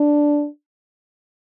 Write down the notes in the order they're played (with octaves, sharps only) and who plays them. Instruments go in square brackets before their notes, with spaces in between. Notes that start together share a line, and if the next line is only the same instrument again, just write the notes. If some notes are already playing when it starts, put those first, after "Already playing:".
Already playing: [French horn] D4